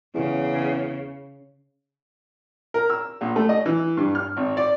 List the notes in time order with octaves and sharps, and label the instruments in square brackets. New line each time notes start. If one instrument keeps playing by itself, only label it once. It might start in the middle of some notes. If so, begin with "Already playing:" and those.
[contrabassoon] E2 [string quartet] C#3
[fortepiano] A#4
E6
A#1
A3
D#5
E3
G2
F6
G#1
D5